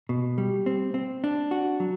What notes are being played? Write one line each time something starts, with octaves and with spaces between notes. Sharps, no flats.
B2
G3
C4
C4
D4
F#4
F#3